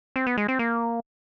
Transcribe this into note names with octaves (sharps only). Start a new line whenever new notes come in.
C4
B3
G#3
C4
A#3